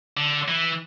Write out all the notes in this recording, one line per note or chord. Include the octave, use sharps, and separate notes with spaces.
D3
E3